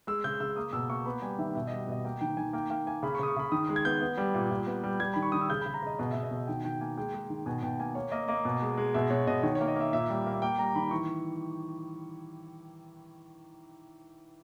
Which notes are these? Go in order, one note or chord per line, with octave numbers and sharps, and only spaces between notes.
G#3 E6
C#3 G6
C#3 E6
A#3 D#6
B2 E6
A#3 C#6
B3 B5
G3 G#5
D#3 E5
B2 E5
G3 D#5
B2 D#5
A#3 G5
D#3 G5
D#3 G#5
A#3 G5
A#3 G5
A#3 G#5
C#3 B5
C#6
C#3 D#6
C#6
C#3 B5
D#3 D#6
G#3
G#6
B3 G6
B3
G3
A#2
A#2
B3
G3
G3 G#6
D#3 B5
C#6
D#3 D#6
E6
C#3 G6
C#3 B5
A#5
C#3 D#5
B2 D#5
B2 E5
D#5
B2 E5
D#3 G5
D#3 G5
A#3 G#5
G#3 G5
G#3
D#3
B2 G#5
B2 G5
A#3 G#5
A#3 C#5
A#3 D#5
A#3 D#5
B2
G#3
G#3
B2 E5
B2 C#5
B2 D#5
D#3 C#5
C#5
A#3
D#5
A#3 E5
A#2 E5
G3
A#3
E5
A#3 G5
G3 A#5
D#3 B5
E3 C#6